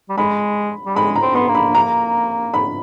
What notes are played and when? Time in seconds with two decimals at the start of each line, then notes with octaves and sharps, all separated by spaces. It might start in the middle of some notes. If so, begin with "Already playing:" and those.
0.09 G3
0.17 G#3 B5
0.86 G3
0.96 G#3 B5
1.16 A#5
1.22 C4
1.35 B3 C6
1.49 A#3
1.55 B5
1.75 A#5
2.54 B5